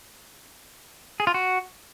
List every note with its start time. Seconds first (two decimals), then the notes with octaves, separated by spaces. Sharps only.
1.20 G#4
1.27 F4
1.34 F#4